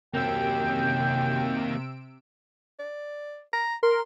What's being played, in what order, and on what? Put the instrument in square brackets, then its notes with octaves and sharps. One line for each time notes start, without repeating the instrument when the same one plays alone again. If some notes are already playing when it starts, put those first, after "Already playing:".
[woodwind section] F#2 G5 [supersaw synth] C3 E6 D7 [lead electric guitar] A#3 G4
[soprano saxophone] D5
A#5
[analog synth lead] A#4 [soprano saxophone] C6